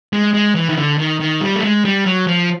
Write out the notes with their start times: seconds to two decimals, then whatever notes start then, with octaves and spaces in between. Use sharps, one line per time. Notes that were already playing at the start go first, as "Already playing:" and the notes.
0.13 G#3
0.34 G#3
0.55 E3
0.69 D#3
0.77 D3
0.98 D#3
1.20 D#3
1.41 G3
1.56 A3
1.63 G#3
1.85 G3
2.06 F#3
2.27 F3